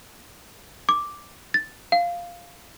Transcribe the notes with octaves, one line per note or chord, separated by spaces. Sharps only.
D6
A6
F5